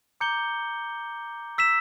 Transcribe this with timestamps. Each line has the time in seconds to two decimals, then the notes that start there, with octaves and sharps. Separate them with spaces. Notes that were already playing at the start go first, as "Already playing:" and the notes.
0.20 A#5 D6 G6 C#7 G7
1.58 E6 B6 E7